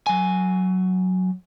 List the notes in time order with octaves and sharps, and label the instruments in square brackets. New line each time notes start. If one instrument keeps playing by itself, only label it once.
[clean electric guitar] F#3 G#5